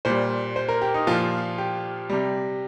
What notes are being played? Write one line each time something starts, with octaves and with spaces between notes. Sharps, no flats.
A#2 G3 C5
C5
A#4
G4
D#4
A#2 F3 F4
G4
C3 G3